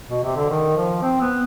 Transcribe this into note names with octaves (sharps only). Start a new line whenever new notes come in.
B2
C3
D3
D#3
F3
C4
B3